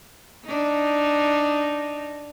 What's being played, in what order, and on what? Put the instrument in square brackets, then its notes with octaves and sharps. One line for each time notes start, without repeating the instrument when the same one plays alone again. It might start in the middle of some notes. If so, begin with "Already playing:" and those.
[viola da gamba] D4 D#4